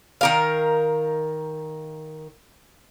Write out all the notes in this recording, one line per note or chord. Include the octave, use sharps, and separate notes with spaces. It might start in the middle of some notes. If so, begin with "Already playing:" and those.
D#3 A#4 F5